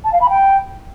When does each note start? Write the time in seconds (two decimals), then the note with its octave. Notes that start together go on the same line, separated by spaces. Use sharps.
0.04 A5
0.12 F5
0.20 B5
0.29 G5